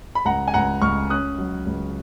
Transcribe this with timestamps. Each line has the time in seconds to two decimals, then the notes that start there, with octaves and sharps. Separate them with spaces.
0.15 B5
0.25 C#2 F#5 A#5
0.48 G#5
0.54 C#2 F#5 A#5
0.82 C#2 C#6 F6
1.10 C#4 D#6 F#6
1.38 F#3
1.67 C#2